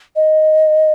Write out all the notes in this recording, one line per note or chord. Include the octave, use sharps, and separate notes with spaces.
D#5